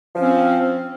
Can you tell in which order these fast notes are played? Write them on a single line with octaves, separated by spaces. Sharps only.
F3 C#4 C4